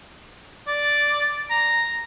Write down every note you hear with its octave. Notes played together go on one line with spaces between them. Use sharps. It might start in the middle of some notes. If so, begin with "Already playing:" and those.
D5
A#5